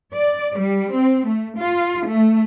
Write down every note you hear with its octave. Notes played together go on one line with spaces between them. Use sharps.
D5
G3
C4
A3
F4
A3